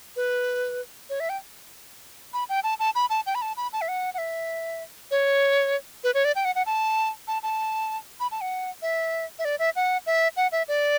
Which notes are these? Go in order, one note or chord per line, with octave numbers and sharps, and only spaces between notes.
B4
C#5
E5
G5
B5
G5
A5
A5
B5
A5
G5
B5
A5
B5
A5
E5
F#5
F#5
E5
C#5
B4
C#5
D5
G5
F#5
F#5
A5
A5
A5
B5
A5
F#5
E5
E5
D5
E5
F#5
E5
F#5
E5
D5